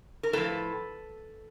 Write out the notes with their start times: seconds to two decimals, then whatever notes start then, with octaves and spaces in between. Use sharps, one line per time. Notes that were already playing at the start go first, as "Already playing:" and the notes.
0.23 A#4
0.33 A2 F3 A4 B4